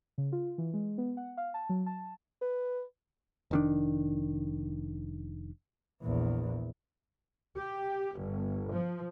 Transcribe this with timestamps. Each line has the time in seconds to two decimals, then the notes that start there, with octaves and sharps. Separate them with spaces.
0.18 C#3
0.32 F4
0.58 E3
0.74 G#3
0.98 B3
1.17 F#5
1.37 F5
1.54 A5
1.69 F#3
1.86 A5
2.41 B4
3.51 F1 D#3 D4
6.03 A#1 E2
7.57 G4
8.20 G1
8.74 F3